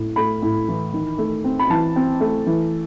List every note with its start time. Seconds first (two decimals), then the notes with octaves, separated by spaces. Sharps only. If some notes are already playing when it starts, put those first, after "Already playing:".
Already playing: A2
0.16 A3 B5
0.42 A2
0.68 E3
0.93 D#3
1.18 A3
1.44 C4
1.59 B5
1.70 E3 A5
1.96 C4
2.20 A3
2.46 E3